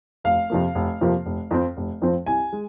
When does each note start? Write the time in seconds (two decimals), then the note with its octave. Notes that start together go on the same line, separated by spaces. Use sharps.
0.24 F1 F5
0.50 F2 C3 F3 A#3
0.75 F1
1.01 F2 C3 F3 A#3
1.26 F1
1.51 F2 F3 C4
1.77 F1
2.02 F2 F3 C4
2.26 C2 G#5
2.52 G#3